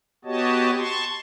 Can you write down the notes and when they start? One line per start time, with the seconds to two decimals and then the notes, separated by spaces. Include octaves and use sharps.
0.25 B3 F#4 G4 C#5 D#5 A5
0.77 A5 C6 C#6